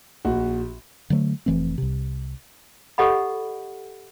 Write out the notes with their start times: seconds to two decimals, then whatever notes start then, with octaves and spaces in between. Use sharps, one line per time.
0.25 A#1 F#4
1.10 D3 F#3 A3
1.46 F1 E3 A3 C4
1.78 C2 C3
2.98 G4 A4 D#5 F#5 B5